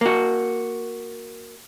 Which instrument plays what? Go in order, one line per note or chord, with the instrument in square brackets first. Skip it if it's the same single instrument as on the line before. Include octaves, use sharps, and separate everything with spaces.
[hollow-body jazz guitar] A#3 F#4